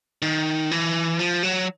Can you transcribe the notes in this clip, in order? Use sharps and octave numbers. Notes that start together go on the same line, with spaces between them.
D#3
E3
F3
F#3